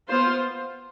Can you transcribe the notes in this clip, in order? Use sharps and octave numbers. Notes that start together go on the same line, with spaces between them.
B3 F4 C5